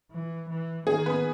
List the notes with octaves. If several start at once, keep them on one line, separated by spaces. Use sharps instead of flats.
E3
E3
D#3 G#4
B3 B4